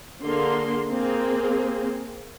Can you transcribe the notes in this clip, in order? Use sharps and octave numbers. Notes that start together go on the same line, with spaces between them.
D3 A#3 G#4 C6
A#3 C4 G#4